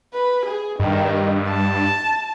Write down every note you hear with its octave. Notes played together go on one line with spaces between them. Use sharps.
B4
G#4
G2 D#3
A5